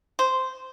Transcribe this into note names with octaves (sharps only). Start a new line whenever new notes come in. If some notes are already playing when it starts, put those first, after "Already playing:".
C5